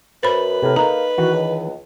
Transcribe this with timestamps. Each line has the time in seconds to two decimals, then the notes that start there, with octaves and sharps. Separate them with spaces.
0.23 F#2 B4 C5 B5
0.62 A2 C3 A#4
0.76 A#3 D#4 A4 A#5
1.18 D#3 E3 F#4
1.32 C#2